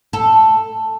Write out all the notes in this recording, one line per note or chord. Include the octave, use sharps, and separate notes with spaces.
A4